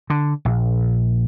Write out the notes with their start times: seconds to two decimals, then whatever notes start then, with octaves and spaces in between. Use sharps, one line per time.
0.10 D3
0.45 A#1